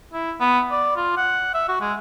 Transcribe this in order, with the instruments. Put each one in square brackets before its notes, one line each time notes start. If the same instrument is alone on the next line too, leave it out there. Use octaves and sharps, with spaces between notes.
[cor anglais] E4
B3
D5
F4
F#5
E5
F#4
G#3